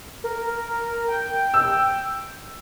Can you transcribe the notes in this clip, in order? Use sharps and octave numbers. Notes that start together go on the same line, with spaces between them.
A#4
G5
E6